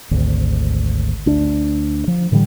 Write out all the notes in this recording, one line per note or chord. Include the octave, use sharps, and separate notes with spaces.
G#1 D2
D2 D4
F3
A2 D3 E3 G3